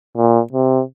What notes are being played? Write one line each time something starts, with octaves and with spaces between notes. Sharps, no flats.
A#2
C3